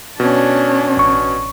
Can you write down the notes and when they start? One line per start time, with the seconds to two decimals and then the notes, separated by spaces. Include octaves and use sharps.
0.20 B2 C#4 D4
0.97 A1 C#6